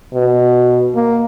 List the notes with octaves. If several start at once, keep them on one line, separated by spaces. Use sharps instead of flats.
B2
A#3